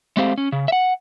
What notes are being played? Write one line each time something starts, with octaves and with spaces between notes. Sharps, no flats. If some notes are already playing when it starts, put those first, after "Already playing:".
G#3 A3 C4 G4 C5 F5
C#4
C#3
E5 F#5